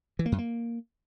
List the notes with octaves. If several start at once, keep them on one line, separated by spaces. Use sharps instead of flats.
E3
A#3
F#2
A#3